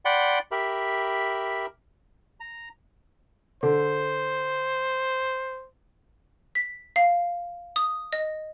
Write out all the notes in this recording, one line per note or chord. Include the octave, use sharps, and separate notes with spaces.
D5 F#5 G5 B5 C6
G4 A#4 E5 B5
A#5
D3 C5
B6
F5
D#6
D#5